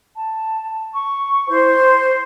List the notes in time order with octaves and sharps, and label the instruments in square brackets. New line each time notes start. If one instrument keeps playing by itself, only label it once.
[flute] A5
C#6
[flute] E4 [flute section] C5
[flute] C6